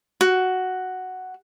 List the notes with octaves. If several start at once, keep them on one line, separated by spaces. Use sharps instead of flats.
F#4